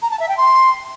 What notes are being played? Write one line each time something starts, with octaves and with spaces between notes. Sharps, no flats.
A#5
A5
E5
G5
C6